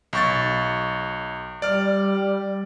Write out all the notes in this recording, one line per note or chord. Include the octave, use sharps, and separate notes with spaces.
B1 C#6 A6
G3 D5 F6